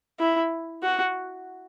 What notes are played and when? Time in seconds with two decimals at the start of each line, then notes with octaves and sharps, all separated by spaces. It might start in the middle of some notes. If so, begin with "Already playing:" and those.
0.19 E4
0.82 F#4